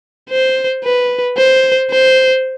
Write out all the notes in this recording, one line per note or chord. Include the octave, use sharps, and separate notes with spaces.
C5
B4
C5
C5